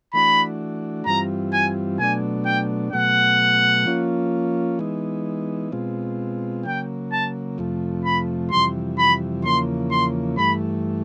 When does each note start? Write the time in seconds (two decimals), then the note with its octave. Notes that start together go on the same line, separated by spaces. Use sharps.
0.13 E3 A3 D4 F#4 B5
1.06 G2 E3 G3 C4 F4 A#5
1.53 G#5
1.99 B2 F#3 A3 D4 G#5
2.46 G5
2.93 B2 F#3 A3 F#5
3.86 F3 A#3 C#4 F4
4.79 E3 G#3 B3 D#4
5.72 B2 G#3 C4 F4
6.65 C#3 F#3 A#3 G5
7.12 A5
7.58 F2 C3 F3 A3
8.05 B5
8.52 F2 C3 E3 G3 C6
8.99 B5
9.44 E2 C#3 F3 A#3 C6
9.91 C6
10.38 G2 E3 A3 B5